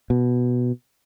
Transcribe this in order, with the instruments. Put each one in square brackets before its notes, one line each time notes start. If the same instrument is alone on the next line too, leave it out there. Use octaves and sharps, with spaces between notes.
[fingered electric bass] B2